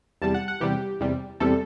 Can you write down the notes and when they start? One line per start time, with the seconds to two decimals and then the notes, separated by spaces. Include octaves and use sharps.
0.22 E2 C3 G3 A5
0.34 F#5
0.48 F#5
0.61 E2 C3 G3 G4
1.00 E2 C3 G3
1.40 E2 C3 G3 A4